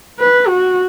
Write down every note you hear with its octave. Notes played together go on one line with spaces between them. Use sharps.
B4
F#4